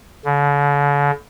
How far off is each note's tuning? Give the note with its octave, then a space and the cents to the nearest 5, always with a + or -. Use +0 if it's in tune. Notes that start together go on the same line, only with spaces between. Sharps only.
D3 -40